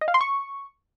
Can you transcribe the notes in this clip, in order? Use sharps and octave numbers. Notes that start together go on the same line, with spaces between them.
D#5
F5
C6
C#6